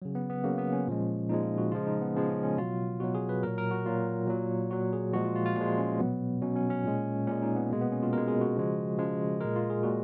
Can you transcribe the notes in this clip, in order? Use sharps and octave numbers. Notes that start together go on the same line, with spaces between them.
C#3 F#3
B3
B3
C#3 F#3 A#3
B3
C#4
A#2 F3 G#3
A#2 F3 G#3 D#4
F4
F#4
C#3 F3 G#3 F4
D#4
B3
C#3 F3 G#3
C#4
C#4
B2 F#3 F4
B2 F#3 F#4
G#4
B4
A#2 F#3 A#4
A#4
F#4
A#2 F#3 F4
A#2 F#3
A#2 F#3 F#4
G#4
A#2 F3 G#3 F#4
F4
F4
F4
A#2 F3 G#3 F4
C#4
B2 F#3 B3
B2 F#3 C#4
C#4
C#4
A#2 G#3
A#2 G#3 C#4
D#4
B3
B2 G#3 A#3
B3
C#4
F4
B2 G#3 A#4
G#4
F#4
C#3 F3 G#3
C#3 F3 G#3
A#2 G#3 A#4
F4
G#4
A#2 F#4